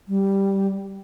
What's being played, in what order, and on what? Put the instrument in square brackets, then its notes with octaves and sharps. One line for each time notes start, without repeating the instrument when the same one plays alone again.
[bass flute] G3